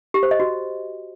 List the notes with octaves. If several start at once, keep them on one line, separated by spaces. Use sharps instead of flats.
G4
C5
D#5
F#4